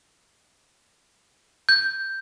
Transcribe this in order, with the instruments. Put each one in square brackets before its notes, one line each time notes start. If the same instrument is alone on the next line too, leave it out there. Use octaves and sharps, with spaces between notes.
[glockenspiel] G6